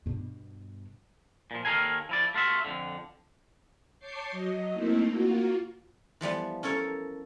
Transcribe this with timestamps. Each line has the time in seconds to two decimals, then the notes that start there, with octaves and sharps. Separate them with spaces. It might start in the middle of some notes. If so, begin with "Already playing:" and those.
0.06 G2 B2
1.51 A#2 F3
1.65 D#2 D#3 A4 A#4 F5 G#5
2.09 F3 E4 D5
2.34 A3 F4 F#4 E5
2.65 F2 D3
3.99 C#5 A5 C#6 D6 G6 C7
4.31 F#3 D#5
4.74 A3 A#3 C4 D#4 E4
5.10 A#3 F4 F#4
6.21 E3 F3 G3 B3
6.63 C#4 A4 A#4 C#5